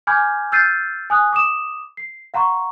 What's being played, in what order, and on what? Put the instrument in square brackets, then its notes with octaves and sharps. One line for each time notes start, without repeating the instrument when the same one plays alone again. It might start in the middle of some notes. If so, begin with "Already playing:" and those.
[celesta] G#5 B5 D6 F6 G6 G#6
E6 F6 G6 A6 C7 D#7
G#5 D#6 F#6
D6 D#6 E7
C7
F5 F#5 A#5 C6 C#6